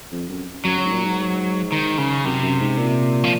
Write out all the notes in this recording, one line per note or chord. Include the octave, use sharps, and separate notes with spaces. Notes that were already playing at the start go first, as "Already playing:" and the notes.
F2
F#2
F#2 F#3
C#3
G#2
A#2
G#2
D#3
C#3
F#2 C3
F#2
G#2
A#2
F3